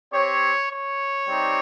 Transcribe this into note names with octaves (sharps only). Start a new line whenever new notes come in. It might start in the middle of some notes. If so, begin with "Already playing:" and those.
C4 G4 C#5
C#5
G3 C4 D#4 G4